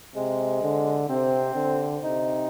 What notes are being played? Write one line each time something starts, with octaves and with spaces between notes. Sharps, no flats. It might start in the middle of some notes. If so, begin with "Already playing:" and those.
C3 G#3
D3
C3 C4
D3
C3 D#4